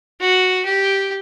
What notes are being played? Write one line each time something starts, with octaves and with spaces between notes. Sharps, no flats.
F#4
G4